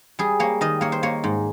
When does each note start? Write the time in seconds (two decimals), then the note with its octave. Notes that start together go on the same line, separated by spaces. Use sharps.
0.19 G3 G#4
0.40 A#3 C#5
0.61 D#3 D#5
0.81 A#3 C#5
0.92 C5
1.03 A#3 C#5
1.24 G#2